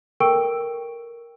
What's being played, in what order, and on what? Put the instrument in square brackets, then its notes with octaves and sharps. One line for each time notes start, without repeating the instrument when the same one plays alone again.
[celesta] A4 A#4 G5 C#6 E6 D7